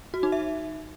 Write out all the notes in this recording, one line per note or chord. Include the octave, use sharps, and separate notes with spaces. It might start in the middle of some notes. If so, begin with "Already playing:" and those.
F#4
D#4
E5